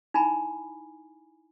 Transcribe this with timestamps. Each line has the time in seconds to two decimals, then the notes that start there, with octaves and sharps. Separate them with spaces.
0.14 D#4 E4 G#5 A#5 B5